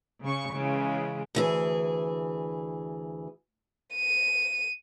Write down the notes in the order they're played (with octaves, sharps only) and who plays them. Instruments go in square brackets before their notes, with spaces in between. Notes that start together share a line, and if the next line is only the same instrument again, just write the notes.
[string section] C#3 C#6
C#3 E3 G#3
[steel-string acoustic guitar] D2 E3 G#4
[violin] D#7